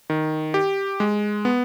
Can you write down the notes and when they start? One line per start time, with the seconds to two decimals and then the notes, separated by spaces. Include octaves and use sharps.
0.10 D#3
0.54 G4
1.00 G#3
1.45 B3